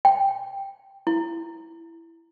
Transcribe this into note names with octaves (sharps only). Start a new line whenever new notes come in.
G5
E4